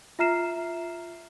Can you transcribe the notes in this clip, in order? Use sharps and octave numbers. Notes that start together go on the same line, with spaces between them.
F4 E5 A#5 F6 C7 E7